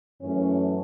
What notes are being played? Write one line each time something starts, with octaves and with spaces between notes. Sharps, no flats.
F#2 E3 A3 C#4